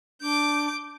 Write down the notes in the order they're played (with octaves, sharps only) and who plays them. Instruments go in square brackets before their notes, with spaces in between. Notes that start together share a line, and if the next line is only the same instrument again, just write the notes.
[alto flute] D4 [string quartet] D6 G6